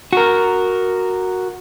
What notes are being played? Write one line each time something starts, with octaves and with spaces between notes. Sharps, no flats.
F#4 A#4